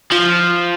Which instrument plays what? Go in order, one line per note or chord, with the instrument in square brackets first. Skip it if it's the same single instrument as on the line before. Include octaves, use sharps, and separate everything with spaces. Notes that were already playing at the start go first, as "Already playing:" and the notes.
[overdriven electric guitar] F3